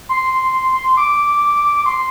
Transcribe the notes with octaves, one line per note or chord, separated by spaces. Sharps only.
C6
D6
C6